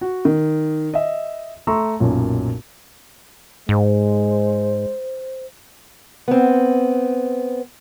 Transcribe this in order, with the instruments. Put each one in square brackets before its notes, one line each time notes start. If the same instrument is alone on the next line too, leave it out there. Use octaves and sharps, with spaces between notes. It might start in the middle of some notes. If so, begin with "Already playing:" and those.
[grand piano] F#4
D#3
D#5 E5
A3 A#5 C6 C#6 E6
B1 F#2 A#2
[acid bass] G#2 [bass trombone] G#3 [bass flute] C5
[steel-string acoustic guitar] B3 C4